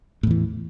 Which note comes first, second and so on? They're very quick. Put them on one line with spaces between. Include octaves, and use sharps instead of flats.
A2 E2 E3